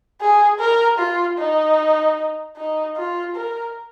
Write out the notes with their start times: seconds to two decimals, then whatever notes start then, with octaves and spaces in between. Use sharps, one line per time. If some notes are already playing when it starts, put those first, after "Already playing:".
0.21 G#4
0.60 A#4
0.99 F4
1.39 D#4
2.57 D#4
2.97 F4
3.36 A#4